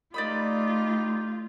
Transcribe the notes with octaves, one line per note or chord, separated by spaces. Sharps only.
A3 D#4 F4 G4 D5 D#5 B5